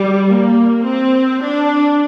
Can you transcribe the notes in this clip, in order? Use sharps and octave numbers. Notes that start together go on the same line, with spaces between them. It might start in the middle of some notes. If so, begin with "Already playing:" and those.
Already playing: G3
A#3
C4
D4